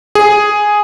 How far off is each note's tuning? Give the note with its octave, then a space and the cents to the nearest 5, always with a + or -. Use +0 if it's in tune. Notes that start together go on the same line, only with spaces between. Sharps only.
G#4 +0